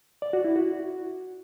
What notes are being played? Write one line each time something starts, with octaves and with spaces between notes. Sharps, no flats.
D5
F#4
E4
F#4